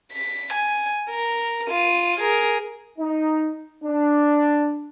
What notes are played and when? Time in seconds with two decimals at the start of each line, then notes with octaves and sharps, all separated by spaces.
0.12 B6
0.53 G#5
1.10 A#4
1.70 F4 D#7
2.20 G#4 A#4
2.99 D#4
3.84 D4